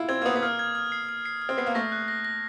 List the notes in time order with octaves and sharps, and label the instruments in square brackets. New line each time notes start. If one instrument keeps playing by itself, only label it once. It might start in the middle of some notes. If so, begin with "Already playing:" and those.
Already playing: [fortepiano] E4 F4
[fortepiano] C4 [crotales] G#6
[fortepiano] A#3
[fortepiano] B3 [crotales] D#6
[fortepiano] B3
[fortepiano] A#3 [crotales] F6
[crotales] G#6
F6
C7
F6
C7
F6
[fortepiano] C4
[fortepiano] B3 [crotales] C7
[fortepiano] A#3
[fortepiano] A3 [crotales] A#6
[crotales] F#6
A#6
A#6